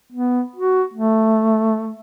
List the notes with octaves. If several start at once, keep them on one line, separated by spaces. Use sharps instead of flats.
B3
F#4
A3